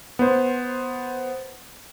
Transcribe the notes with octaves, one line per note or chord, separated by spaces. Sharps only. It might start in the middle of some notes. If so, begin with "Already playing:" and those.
B3 C5